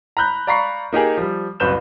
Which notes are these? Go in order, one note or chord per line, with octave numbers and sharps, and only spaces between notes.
A#5 B5 F#6 G6
D5 F5 A#5 B5 C#6 C7
A#3 D#4 G4 G#4
F3 G3
F#1 C2 F#2 B4 G6 E7